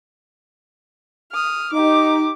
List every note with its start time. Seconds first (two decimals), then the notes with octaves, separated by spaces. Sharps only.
1.32 D#6 F6
1.73 D#4 G4 D6